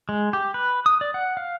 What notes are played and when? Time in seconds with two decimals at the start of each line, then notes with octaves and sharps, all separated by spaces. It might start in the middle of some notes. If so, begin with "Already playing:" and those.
0.09 G#3
0.33 G4
0.54 B4
0.86 D#6
1.01 D5
1.14 F#5
1.37 F5